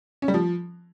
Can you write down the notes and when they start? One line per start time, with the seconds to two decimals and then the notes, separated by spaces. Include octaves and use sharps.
0.22 C#4
0.28 G3
0.34 F3